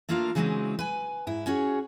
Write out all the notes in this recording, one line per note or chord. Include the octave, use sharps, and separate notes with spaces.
A3 A#3 D4 F4 A#4 F5
C#3 E3 F#3 G#3 C4 D#4
B4 G#5
G#2 E4
C#4 F#4 G#4 C#5